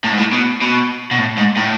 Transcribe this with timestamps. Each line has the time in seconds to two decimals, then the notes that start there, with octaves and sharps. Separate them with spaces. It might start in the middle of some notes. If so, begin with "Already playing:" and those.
0.04 A2
0.13 G#2
0.19 A2
0.33 B2
0.62 B2
1.11 B2
1.18 A2
1.37 G#2
1.56 A2